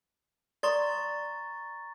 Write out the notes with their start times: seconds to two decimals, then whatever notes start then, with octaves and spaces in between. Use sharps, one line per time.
0.63 D5 A#5 C6 C#6 D#6 A6